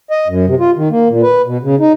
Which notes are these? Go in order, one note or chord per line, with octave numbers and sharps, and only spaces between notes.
D#5
F#2
C3
F4
D#3
A#3
A#2
B4
B2
C#3
D#4